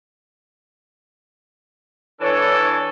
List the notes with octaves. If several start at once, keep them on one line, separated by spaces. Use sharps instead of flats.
E3 D4 A4 C#5